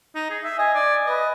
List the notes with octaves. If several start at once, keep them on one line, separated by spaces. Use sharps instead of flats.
D#4
G#4
E5
D#5 G#5
D5
B4 D#5